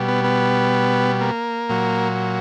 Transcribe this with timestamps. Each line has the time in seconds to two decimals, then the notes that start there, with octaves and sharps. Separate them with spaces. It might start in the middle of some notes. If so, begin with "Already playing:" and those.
Already playing: B2 G3
0.08 B3
0.24 B3
1.21 A#3
1.69 A#2 F#3